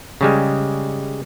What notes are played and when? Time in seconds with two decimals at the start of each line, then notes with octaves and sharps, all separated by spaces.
0.21 C#3 G3 G#3